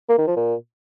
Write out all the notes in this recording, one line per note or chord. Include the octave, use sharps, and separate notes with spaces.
A#3
D#3
F3
A#2